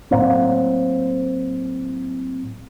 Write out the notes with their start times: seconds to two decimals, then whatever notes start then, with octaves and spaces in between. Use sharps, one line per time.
0.11 A2 F#3 A#3 C4